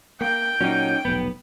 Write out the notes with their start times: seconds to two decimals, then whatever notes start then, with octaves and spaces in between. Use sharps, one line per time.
0.21 A#3 G5
0.61 A#2 F#3 C#4 D#4
1.05 F1 B1 B3